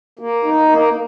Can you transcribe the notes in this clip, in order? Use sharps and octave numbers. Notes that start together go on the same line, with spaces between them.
A#3
D#4
A#3